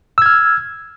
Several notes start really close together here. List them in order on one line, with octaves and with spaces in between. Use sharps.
E6 G#6 F6